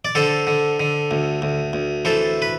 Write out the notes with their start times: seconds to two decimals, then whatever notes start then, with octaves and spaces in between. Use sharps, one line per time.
0.05 D5
0.15 D3 A4 C5
0.47 D3
0.80 D3
1.11 D2
1.42 D2
1.73 D2
2.05 E3 A4 C5
2.42 B4